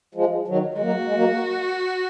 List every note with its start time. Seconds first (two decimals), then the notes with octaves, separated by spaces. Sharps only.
0.15 F3 G#3
0.48 D#3 F#3
0.74 G#3
0.81 F#3 A#3 F#4
1.06 G#3
1.14 F#3 A#3